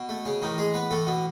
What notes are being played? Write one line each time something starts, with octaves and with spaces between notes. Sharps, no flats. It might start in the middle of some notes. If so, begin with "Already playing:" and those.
Already playing: B2
A3
C#3 C#4
A2 D#3 E3 D#4
G#3 G#4
B3 B4
A2 E3 A3 A4
B2 B3